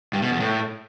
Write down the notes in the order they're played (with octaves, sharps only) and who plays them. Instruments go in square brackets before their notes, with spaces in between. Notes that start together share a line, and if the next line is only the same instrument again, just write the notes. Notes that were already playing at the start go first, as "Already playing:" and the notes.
[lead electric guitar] G2
B2
E2
A2